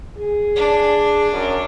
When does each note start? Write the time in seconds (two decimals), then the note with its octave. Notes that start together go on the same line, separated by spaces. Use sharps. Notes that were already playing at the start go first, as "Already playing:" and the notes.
0.18 G#4
0.56 D4
1.32 F#2